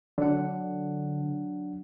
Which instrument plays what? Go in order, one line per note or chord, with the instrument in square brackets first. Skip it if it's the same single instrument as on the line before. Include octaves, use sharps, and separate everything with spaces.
[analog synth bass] D3 [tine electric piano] F#3 D4 F#5